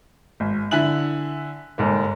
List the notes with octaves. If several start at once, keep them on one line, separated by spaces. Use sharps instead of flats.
G#1
D3 E4 E5 G#5 F#6 F#7
G1 G#2 A#3